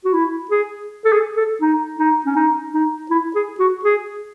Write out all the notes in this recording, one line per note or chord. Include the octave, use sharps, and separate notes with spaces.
F#4
E4
G#4
A4
G#4
A4
D#4
D#4
C#4
D#4
D#4
E4
G#4
F#4
G#4